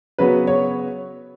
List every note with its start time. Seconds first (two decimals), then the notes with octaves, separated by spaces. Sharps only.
0.19 C#3 F#3 B3 B4
0.47 C#5